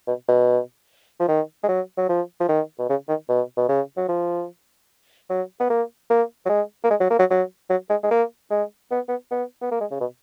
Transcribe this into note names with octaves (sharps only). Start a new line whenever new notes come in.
B2
B2
F3
D#3
G#3
F#3
F#3
F3
F3
D#3
B2
C#3
D#3
B2
B2
C#3
F#3
F3
F#3
B3
A#3
A#3
F#3
G#3
A#3
G#3
F#3
A#3
F#3
F#3
F#3
G#3
G#3
A#3
G#3
B3
B3
B3
B3
A#3
G#3
C#3
B2